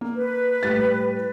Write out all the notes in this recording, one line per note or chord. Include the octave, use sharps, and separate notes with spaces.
A#3
B4
A2 G3 A6